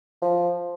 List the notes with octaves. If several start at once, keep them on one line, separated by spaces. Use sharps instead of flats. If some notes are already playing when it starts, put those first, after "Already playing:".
F3